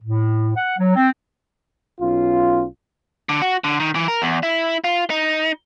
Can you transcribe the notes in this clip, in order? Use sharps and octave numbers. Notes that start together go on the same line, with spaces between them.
A2
F#5
F#3
C4
B1 C#4 F4
D3
F#4
D3
D#3
E3
A#4
E2
E4
F4
D#4